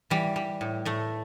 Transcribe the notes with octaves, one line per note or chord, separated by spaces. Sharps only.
E3 G3
G3
A2
A2 A3